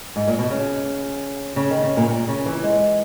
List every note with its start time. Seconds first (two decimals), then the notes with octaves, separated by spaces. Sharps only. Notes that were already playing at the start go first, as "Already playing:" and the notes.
0.16 G#2
0.28 A#2
0.38 B2
0.50 C#3
1.56 C#3
1.70 D#3
1.83 C#3
1.97 A#2
2.10 A#2
2.28 C#3
2.46 E3
2.63 G#3